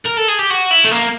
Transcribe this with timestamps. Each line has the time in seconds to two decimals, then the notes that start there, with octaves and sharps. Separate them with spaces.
0.05 A#4
0.17 A4
0.28 G#4
0.39 G4
0.50 F#4
0.71 E4
0.85 A3
0.91 A#3